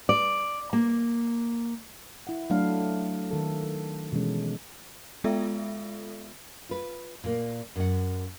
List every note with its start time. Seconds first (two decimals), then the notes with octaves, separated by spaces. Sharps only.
0.09 D5
0.73 A#3
2.27 E4 F#5
2.50 F#3 A3 D4 F5
3.31 D#3 A4
4.12 B2 E3 G#3 C#4
5.24 G#3 B3 F4 A4 E5
6.69 F4 B4
7.24 A#2 A#3
7.76 F#2 F#5